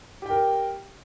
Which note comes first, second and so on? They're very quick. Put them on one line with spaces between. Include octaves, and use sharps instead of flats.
G4 G5 A#4